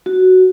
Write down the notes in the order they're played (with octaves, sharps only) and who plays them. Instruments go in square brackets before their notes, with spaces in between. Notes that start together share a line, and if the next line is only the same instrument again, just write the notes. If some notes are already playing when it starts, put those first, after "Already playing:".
[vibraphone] F#4